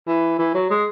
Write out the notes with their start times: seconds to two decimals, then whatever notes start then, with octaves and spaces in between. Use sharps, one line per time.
0.07 E3
0.39 E3
0.54 F#3
0.70 G#3